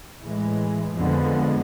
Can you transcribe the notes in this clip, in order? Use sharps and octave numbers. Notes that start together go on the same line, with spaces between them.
A2 E3 G#3
F2 D3 F3 G#3 B3